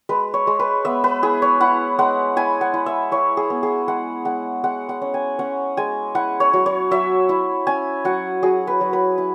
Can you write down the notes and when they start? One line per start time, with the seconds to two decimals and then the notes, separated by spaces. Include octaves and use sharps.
0.09 G#3 B4
0.34 C#5
0.47 G#3
0.59 B4
0.85 B3 E5
1.04 B4
1.22 E4 G#4
1.42 C#5
1.60 E4 F#5
1.99 G#3 F#5
2.36 E4 G#5
2.61 F#5
2.74 E4
2.86 E5
3.12 E4 C#5
3.37 G#4
3.50 B3
3.63 G#4
3.88 G#3 F#5
4.25 G#3 F#5
4.64 G#3 F#5
4.89 F#5
5.02 C#4
5.14 G#5
5.39 C#4 F#5
5.77 G#3 G#5
6.15 E4 F#5
6.40 C#5
6.53 F#3
6.66 C#5
6.91 F#3 E5
7.29 E4
7.67 C#4 G#5
8.05 F#3 F#5
8.43 F#3 G#4
8.67 B4
8.81 F#3
8.93 B4
9.18 E4